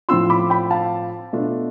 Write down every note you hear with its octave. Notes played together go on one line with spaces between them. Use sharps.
A2 F3 C4 F4 C6 E6
B5 D6
G5 B5
F5 A5
B2 A3 D4 F4